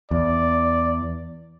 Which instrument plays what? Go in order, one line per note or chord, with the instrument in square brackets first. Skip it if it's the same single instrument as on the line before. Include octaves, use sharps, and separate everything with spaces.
[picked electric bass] E2 [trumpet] D5